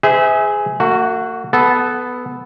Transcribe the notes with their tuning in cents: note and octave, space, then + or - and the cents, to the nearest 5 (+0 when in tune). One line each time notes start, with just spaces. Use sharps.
G#4 +0 C5 -45 E5 -25
A#3 -45 F#4 +0
B3 +5 A4 -15